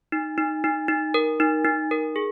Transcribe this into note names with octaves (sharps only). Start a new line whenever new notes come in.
D#4
D#4
D#4
D#4
A#4
D#4
D#4
A#4
G#4